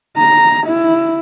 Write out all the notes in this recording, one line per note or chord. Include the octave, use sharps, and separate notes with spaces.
A#5
E4